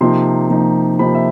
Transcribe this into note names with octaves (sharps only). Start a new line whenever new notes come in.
C3 F3 A#3 D#4 C6
C3 F3 A#3 D#4
C3 F3 A#3 D#4 B5
E5